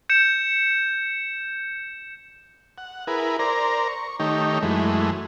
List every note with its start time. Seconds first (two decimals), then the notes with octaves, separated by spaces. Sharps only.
0.09 G6 C#7 E7
2.78 F#5
3.07 E4 G#4 A#4 B4
3.39 A#4 C5 D5 A#5
3.88 C#6
4.20 D#3 A3 D#4 G4 C#5
4.62 F#2 E3 G#3 A3